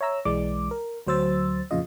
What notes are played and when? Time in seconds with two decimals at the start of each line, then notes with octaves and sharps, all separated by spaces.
0.01 C#5 E5 A#5 E6
0.25 B1 E3 G#3 D5 D6
0.71 A#4
1.07 D2 F#3 C5 E6 A6
1.71 F2 A#2 C#3 F4 D#5